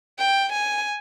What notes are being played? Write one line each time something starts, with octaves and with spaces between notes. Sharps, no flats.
G5
G#5